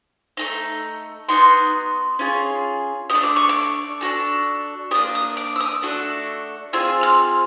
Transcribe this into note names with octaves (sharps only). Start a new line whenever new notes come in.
A3 C4 D#4
B3 D#4 F#4 C6
C#4 F4 G#4
A3 D4 G4 D#6
D6
C#6
D6
D4 F#4 A4
A#3 D4 G4 D#6
D#6
D6
E6
D#6
A3 D4 F#4 A4
C4 F4 G#4 E6
F6